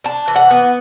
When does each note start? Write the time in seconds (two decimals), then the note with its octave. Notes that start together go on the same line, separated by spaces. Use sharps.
0.04 D4 A5
0.28 E3
0.36 F#5
0.50 B3